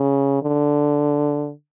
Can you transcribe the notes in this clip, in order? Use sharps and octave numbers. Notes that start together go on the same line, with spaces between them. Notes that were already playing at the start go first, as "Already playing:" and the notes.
Already playing: C#3
D3